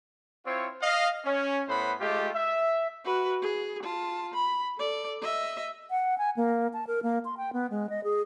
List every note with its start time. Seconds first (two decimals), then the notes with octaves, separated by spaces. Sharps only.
0.46 C4 E4 F4 C#5
0.81 D#5 F5
1.25 C#4
1.68 A2 B3 C5 F#5 B5
2.00 G#3 A3 F4 G4
2.34 E5
3.05 F#4 B4
3.42 G#4
3.83 F4 A5
4.34 B5
4.78 A4 D5
5.22 D#5 E5
5.90 F#5
6.18 G#5
6.37 A#3
6.73 A5
6.87 A#4
7.03 A#3
7.25 C6
7.37 G5
7.53 B3
7.70 G#3
7.90 D#5
8.04 G#4